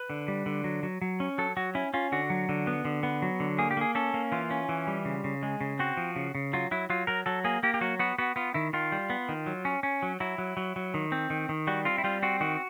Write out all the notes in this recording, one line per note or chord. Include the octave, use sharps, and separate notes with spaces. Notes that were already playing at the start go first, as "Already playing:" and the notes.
Already playing: B4
D3
G3
D3
F#3
F#3
F#3
C#4
F#3 A4
F#3 F#4
C#4 E4
C#4 F4
D3 F#4
F#3
D3
B3
D3
B3
F#3
D3
A#3 G#4
G4
A#3 G#4
C#4 A4
A#3
E3 F4
C#4
E3
G3
C#3
C#3
G#3
C#3
C4 F#4
F3
C#3
C#3
F#3 F4
F#3 E4
F#3 F4
F#3 A#4
F#3 A4
A#3 G#4
A#3 G4
G4
F#3 F#4
B3 F#4
B3 F#4
B3 F4
D#3 E4
D#3 F4
G3
B3
D#3
F#3
C#4
C#4
F#3
F#3 E4
F#3
F#3
F#3
D#3
C4
D#3
D#3
G3 F#4
C4 F4
E4
G3 F4
C4 F#4
D#3 F#4